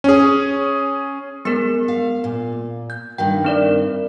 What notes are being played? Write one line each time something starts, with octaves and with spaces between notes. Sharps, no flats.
C#4 G#4
G#3 B3 A#4
F5
A#2
G6
G2 D#3 A#3 G5
C4 A#4 D5